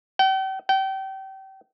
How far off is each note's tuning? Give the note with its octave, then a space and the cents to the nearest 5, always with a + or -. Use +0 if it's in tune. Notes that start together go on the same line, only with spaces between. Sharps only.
G5 -40
G5 -30